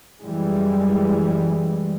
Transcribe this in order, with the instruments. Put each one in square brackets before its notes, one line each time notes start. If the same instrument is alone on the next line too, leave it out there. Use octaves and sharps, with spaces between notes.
[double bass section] F#2 E3 G3 G#3